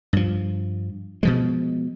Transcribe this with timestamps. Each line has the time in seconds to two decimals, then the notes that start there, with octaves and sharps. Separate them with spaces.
0.13 G2 F3
1.23 B2 F3 G#3